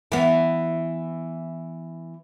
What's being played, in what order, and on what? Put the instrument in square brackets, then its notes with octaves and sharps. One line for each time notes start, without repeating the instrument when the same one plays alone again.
[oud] E3 B3